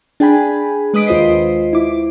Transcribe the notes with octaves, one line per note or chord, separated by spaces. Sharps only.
D4 G#4 G5 G#5 B5
G#3 B4 D#5 D#6 B6 D7
D#2 F4 C5 D#5 C7
E4 D6